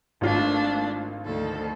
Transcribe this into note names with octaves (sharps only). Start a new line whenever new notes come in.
G#1 A3 D4 F4
D2 D#3 A4